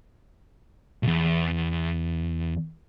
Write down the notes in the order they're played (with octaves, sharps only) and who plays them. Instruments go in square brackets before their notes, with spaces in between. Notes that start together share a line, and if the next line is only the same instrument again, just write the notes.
[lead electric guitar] B1 E2